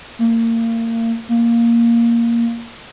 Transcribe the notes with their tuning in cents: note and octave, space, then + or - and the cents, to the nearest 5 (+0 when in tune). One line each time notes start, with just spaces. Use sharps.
A#3 -30
A#3 +0